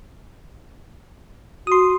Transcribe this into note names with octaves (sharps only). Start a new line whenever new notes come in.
F#4 C6 D#6